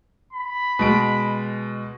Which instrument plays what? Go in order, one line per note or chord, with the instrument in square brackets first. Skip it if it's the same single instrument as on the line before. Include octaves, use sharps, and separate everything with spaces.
[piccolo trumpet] B5
[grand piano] B2 G#3 D7